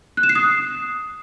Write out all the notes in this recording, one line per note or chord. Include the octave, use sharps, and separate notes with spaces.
F#6
E7
C7
D#6